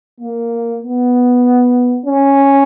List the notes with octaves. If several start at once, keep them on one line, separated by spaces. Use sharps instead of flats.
A#3
B3
C#4